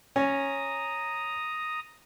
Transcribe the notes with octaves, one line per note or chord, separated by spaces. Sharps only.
C#4 A#5 D#6